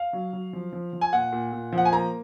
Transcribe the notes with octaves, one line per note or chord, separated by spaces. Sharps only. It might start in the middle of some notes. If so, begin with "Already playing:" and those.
Already playing: F5
F#3
F#3
F3
F3
F3
G#5
A#2 F#5
A#2
A#2
F3
F#5
G#5
A#3 A#5